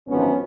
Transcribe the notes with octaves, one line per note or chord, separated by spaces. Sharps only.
G#1 F#2 D3 F3 B3 C#4